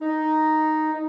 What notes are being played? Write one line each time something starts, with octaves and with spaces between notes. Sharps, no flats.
D#4
D#4